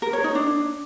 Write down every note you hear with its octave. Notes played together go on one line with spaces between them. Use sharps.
A#4
C#5
D#4
D4